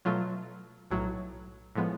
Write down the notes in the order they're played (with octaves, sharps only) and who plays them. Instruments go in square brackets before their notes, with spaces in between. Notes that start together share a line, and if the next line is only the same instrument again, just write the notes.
[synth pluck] B2 F#3 A3 F4
B1 A2 F#3
A2 F3 G#3 B3